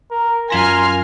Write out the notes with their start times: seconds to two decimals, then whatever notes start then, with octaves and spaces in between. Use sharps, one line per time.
0.11 A#4
0.50 F#2 F4 A#4 G#5 C6 F6 A#6